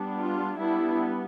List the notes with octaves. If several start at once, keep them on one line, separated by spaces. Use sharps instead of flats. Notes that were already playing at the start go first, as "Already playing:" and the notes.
Already playing: G3 B3 D4
F4
G3 B3 D4 E4